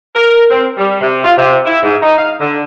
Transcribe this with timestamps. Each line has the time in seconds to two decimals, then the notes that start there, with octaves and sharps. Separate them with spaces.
0.15 A#4
0.51 C4
0.77 G3
1.01 C3
1.25 F4
1.38 C3
1.66 E4
1.83 G#2
2.03 D#4
2.18 F5
2.40 D3